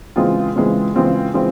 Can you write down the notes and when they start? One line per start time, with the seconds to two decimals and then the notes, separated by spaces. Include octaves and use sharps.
0.16 C#3 E3 G#3 C4 F4
0.55 C#3 E3 G#3 C4 F4
0.95 C#3 E3 G#3 C4 F4
1.34 C#3 E3 G#3 C4 F4